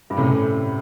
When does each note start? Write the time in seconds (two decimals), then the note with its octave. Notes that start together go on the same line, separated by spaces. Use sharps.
0.10 G2
0.18 F#2 A2 C3